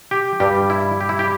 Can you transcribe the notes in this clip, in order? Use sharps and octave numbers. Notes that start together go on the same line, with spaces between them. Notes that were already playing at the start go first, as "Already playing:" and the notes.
G4
G2 G3 G4
E4
G4
E4
G4